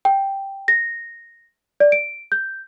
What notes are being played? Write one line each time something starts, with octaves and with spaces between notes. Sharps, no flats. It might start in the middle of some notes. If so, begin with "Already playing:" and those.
G5
A#6
D5
D7
G6